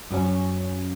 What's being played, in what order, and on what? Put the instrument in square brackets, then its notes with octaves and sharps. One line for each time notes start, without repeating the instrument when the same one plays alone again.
[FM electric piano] F#2 F#3 C#4